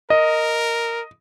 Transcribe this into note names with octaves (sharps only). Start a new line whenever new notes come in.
A#4 D#5